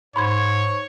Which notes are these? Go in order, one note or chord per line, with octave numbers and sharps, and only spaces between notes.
G#2 C#5 B5 C6 G#6